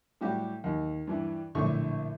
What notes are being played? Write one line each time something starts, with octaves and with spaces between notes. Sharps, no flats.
A2 G3 F#4 G4
D#2
G2 E3
A#1 A2 D3 C#6